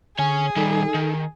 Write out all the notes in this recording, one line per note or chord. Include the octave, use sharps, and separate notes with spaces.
D3 G#4 C#5 G#5
D#3 G3 D#4 A4
D#3